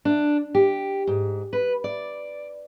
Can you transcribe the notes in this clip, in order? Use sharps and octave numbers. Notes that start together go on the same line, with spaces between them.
D4
G4
G#2
B4
D5